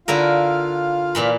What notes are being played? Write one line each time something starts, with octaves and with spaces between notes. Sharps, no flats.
D3 E4 F4 A#4 F5
A#2 E3 B5